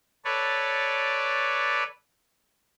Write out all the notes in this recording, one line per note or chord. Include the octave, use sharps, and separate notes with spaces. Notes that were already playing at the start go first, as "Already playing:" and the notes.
A4 B4 C#5 D5